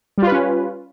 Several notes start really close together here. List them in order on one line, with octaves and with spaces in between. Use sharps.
G3 F4 B4 C#4